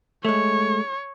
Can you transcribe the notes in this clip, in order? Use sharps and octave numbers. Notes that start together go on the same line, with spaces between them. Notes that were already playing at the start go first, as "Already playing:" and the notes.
G#3 A3 C#5